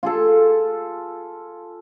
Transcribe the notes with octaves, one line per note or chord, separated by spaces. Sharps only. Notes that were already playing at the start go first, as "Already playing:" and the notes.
F4 G#4 A4